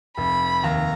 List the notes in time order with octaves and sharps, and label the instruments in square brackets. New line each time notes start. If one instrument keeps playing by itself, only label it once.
[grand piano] F1 [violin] B5
[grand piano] D#2 [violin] A#5